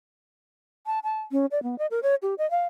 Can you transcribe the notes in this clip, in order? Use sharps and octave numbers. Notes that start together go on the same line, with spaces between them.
A5
A5
C#4
D5
B3
D#5
A#4
C#5
G4
D#5
F5